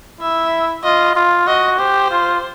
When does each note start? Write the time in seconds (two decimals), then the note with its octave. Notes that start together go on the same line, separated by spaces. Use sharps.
0.21 E4 E5
0.84 F4 D#5
1.15 F4
1.47 F#4 D#5
1.79 G4 C5
2.11 F4